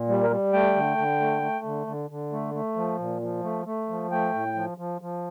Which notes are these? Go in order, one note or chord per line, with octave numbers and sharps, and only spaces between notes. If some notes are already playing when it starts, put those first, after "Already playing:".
Already playing: A#2
G3
A#4
G3
A3 G5
D3
D3
A3
A3
D3
D3
D3
A3
A3
F3
A#2
F3
A3
A3
F3
A3 G5
A2
F3
F3
F3